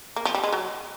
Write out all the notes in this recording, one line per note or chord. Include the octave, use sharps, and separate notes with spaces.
A#3
F3
G3
G#3
F#3